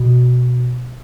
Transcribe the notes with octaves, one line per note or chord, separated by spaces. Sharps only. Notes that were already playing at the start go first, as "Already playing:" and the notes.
Already playing: B2